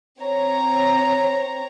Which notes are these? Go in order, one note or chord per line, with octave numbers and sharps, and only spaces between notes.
C4 C#5 A#5